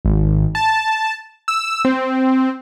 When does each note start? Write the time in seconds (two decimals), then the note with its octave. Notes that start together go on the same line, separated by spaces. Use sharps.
0.05 G#1
0.55 A5
1.48 E6
1.85 C4